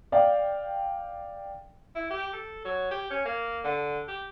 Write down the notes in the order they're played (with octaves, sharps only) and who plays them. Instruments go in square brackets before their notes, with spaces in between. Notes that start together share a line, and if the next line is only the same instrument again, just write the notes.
[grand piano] D5 F5 G5
[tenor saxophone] E4
G4
A4
F#3
G4
C#4
A#3
D3
G4